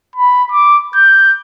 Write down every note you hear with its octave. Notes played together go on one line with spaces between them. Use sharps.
B5
D6
G6